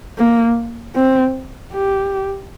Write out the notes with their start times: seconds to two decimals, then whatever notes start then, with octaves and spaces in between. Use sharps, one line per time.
0.18 A#3
0.95 C4
1.73 G4